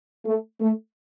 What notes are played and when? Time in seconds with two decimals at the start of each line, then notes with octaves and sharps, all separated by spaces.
0.25 A3
0.60 A3